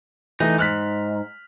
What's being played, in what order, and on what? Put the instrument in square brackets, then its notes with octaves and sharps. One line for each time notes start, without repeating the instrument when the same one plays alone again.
[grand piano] E3 A3 [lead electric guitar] D#4
[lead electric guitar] G#2 [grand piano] F6 F#6 B6